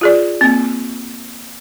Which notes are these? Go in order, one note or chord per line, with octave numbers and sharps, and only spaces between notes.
F4 G#4 D5
A#3 C4